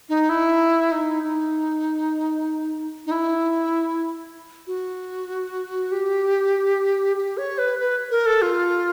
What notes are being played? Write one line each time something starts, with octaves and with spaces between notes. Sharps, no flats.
D#4
E4
D#4
D#4
D#4
E4
F#4
G4
G4
C#5
B4
B4
A#4
A4
F4